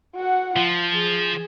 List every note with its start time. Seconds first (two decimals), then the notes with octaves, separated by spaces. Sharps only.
0.15 F#4 F#5
0.56 F3 F4
0.93 G#4